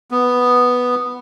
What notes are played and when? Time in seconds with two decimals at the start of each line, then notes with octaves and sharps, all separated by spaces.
0.11 B3